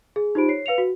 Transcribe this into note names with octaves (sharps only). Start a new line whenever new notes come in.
G#4
D#4 F4 G4 C5 B5 D7
C#5 C7
B4 F5 C#7 F7
F#4